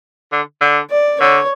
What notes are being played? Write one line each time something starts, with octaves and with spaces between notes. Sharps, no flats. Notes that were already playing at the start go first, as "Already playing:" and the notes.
D3
D3
D5
D3 C#5